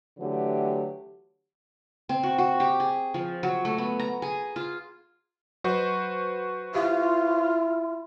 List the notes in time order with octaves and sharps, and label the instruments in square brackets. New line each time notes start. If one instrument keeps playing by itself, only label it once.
[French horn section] D3 E3 F#3 A3 G4
[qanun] C4
F#4
F#4
G4
G#4
F3
F#3
A3
B3
A#5
G#4
F4
[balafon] F#3 [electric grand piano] F#4 B4 C5
[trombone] E4 [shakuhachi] F4 [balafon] G4 E5 F5